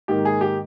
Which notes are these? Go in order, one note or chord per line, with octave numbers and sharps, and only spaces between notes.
G#2 D#3 A#3 G4
G#4
G4